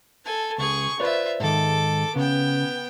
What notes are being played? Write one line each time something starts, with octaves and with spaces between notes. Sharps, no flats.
A4 G#5
C#2 G#4 C#6
F4 B4 C5 D5 E5
G#2 D#3 A4 D6
C#3 B3 G5